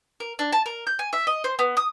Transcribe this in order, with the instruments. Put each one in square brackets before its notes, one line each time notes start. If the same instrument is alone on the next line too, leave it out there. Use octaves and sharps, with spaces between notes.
[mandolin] A#4
D4
A5
A#4
G6
G#5
E5
D#5
C5
B3
D#6